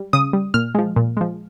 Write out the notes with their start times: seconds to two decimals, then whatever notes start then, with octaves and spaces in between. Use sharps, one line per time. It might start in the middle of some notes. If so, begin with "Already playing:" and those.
Already playing: G3
0.13 C#3 D#6
0.33 G3
0.54 A#2 F6
0.75 F3 G#3
0.96 A#2
1.17 F3 G#3